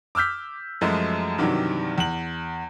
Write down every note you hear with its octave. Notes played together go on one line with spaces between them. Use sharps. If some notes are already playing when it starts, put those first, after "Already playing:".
D6 E6 F6 G6 B6
F#2 F3 G#3 A3
G2 C3 D#3 E3 F#3
E2 F#7